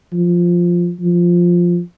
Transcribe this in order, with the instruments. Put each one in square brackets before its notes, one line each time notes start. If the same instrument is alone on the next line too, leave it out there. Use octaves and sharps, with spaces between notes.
[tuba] F3
F3